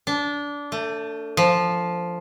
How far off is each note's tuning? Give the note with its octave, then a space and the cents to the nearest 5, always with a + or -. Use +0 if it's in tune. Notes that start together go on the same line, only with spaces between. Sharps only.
D4 -20
A3 +25
F3 +0